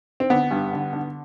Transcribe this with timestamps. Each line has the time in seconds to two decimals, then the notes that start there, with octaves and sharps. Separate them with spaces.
0.20 C4
0.30 D3 B3
0.51 G2
0.73 D3
0.93 D3